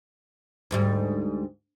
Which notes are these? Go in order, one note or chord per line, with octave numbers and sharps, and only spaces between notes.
D2 G#2 G3